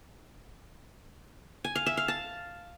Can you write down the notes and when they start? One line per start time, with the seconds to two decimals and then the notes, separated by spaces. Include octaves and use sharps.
1.64 G#5
1.75 F5
1.86 E5
1.97 F5
2.08 A5